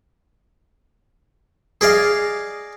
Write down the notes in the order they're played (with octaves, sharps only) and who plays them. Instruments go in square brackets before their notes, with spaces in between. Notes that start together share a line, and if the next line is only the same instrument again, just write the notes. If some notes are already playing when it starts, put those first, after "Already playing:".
[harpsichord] G#4 D5 D#5 F5